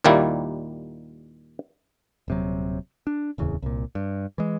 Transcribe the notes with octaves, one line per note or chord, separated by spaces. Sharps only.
D#2 A#2 D#3 G3 A#3 E4
D#1 C3 F#3
D4
D1 E2 C#3
C2 A#2
G2
E3 G#3